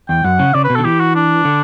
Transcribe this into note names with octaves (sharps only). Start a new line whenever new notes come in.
E2 G5
F#2 F#5
C#3
C#3 D5
B4
B2
D3 A4
E3 G4
F#4
D4
D3